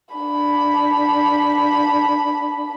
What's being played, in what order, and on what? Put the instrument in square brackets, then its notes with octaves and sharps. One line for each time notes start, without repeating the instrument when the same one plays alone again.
[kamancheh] D4 B5